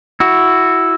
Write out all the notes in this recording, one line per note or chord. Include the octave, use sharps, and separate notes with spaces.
E4 F#4